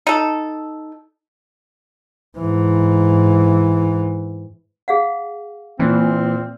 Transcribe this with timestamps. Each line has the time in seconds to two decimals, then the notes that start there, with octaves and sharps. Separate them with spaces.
0.07 D#4 A4
2.38 G#2 E3
4.88 G#4 F5 F#5
5.79 A#2 E3 C4